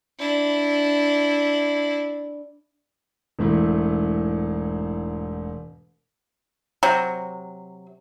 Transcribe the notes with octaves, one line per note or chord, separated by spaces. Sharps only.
D4 E4
E1 G#2 A3 E4
C3 F#3